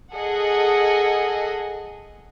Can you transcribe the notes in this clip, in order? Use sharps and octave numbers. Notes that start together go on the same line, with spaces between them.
G#4 A4 D#5 F#5